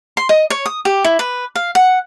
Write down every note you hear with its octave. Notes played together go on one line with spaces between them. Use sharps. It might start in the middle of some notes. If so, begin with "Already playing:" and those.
C6
D#5
C#5
D#6
G4
E4
B4
F5
F#5